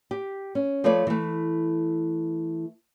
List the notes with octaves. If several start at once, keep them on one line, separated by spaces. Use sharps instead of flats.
G4
C#4
F3 A3 A4 B4 C#5 D5
E3 A3